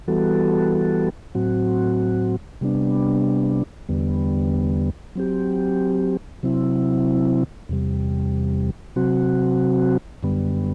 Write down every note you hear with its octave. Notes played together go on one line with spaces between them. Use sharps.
E3 G3 B3 F#4 A4
A2 F#3 C4 F#4
C3 G3 B3 D4
E2 D3 G3 B3
F#3 C4 G4
C3 F#3 C4 E4
E2 C3 G3
C3 F#3 C4 F#4
F#2 D3 G3 B3